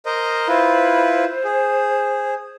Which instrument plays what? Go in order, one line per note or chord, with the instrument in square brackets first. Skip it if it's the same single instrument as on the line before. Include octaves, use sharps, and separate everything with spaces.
[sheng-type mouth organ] A#4 C5 D#5
[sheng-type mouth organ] E4 F4 B4 [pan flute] C5
[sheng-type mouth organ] G#4